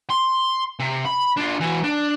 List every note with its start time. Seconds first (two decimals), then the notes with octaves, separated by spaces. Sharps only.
0.10 C6
0.80 C3
1.06 B5
1.37 D4 F4
1.61 E3 F#4
1.84 D4